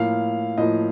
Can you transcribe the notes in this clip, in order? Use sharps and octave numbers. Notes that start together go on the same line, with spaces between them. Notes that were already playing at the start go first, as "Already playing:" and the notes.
Already playing: A2 F3 A#3 F5
A2 F3 A#3 D#5